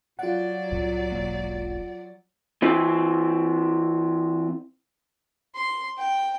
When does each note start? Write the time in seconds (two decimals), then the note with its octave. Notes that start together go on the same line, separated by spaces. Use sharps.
0.19 F#3 F4 D5 F#5
0.72 C2 A2
1.12 E1 B1 A#3
2.62 E3 C4
5.55 C6
5.98 G5